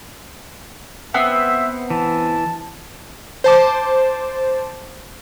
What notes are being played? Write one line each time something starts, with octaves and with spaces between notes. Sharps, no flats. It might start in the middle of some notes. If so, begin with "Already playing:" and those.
B3 C4 E5
E3 A5
C5 A5 D6